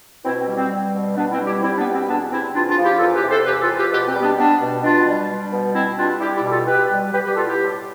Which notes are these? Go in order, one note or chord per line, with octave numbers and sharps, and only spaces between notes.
B2 C4 E4
C4
G3
C4
G3
B2
B2 B3 D4
C4 E4
G3
E4 G4
G3 C4 E4
B3 D4
B2
C4
E2 B3 D4
C3 C4 E4
E2 D4 F4
D4 F4
F3
E4 G4
E2 F4 A4
G4 B4
C3
A4 C5
E2 G4 B4
F4 A4
F3
G4 B4
B2 G4 B4
C4
G3
B3 D4
G3 B3 D4
B2
B2 D4 F4
G3
G3
B2
B2 C4 E4
G3 D4 F4
G3 E4 G4
E4 G4
B2
F4 A4
B2 G4 B4
G3
G3 G4 B4
G4 B4
B2 F4 A4
E4 G4
A2